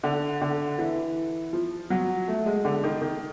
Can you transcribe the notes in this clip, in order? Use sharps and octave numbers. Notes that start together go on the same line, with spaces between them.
D3
D3
E3
F3
F#3
A3
G#3
D3
D#3
D#3